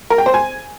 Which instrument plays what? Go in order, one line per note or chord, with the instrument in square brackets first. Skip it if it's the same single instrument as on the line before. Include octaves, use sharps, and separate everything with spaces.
[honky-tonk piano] A#4
G5
C5
G#5